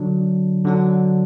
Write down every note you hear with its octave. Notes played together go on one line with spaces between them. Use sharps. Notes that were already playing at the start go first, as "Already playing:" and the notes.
Already playing: D3 F#3 D4
D3 F#3 D4